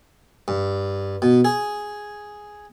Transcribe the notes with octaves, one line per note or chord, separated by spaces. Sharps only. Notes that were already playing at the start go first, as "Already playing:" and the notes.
G2
B2
G#4